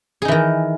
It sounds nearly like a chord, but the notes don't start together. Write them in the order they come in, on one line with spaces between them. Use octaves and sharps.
G#4 D#4 E3 D#3